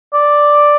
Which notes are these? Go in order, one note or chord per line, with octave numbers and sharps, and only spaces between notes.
D5